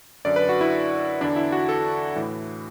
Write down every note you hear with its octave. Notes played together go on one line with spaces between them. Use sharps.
F#2 D3 D5
B4
F#4
E4
E2 D3 D4
E4
F#4
A4
A2 E3